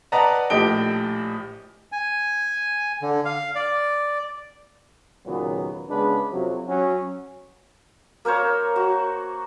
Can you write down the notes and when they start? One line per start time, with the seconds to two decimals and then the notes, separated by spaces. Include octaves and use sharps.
0.12 B4 D5 D#5 F#5 A5 A#5
0.50 A#1 A2 G4 D#5 D7 G7
1.92 G#5
3.02 D3
3.25 F5
3.55 D5
5.26 D#2 A#2 C#3 F#3 B3
5.89 C#3 G#3 B3 D4 B4
6.31 F2 C3 F3 F#3
6.67 F#3 C#4 F#4
8.25 A#3 A#4 C5 C#5
8.76 F#4